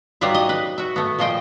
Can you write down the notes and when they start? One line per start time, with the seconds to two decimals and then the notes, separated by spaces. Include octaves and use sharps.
0.21 F#3 G3 D#4 F4 B4 E5
0.34 D#5
0.49 B4
0.78 F#4 E5
0.96 A3 B3
1.18 A#2 F3 C5 D#5 G5